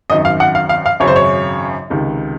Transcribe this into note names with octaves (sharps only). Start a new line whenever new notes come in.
G#1 F#2 D#3 D#5
F5
F#5
F5
F5
F5
G#1 F#2 C#3 C#5
C5
C#5
C#2 C3 D#3